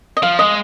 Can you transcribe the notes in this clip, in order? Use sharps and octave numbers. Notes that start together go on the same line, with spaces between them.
D#5
F3 F5
G#3 D#5